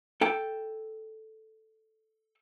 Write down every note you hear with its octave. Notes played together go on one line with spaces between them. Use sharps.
A4 G5